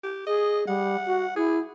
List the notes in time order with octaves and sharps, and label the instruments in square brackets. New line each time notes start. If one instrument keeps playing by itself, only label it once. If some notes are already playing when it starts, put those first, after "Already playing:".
[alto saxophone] G4
[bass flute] G#4 [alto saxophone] D#5
[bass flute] G3 [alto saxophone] F#5
[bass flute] F#4
[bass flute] E4 [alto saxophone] G#4